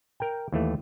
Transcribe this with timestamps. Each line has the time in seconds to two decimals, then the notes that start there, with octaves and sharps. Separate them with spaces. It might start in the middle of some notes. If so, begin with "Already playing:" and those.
0.20 A#4 G5
0.52 D#2 E3 A3